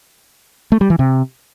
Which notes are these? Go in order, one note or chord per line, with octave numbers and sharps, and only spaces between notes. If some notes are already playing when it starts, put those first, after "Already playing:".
A3
G3
E3
C3